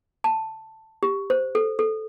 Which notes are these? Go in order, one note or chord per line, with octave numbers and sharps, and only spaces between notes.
A5
G4
C5
A4
A4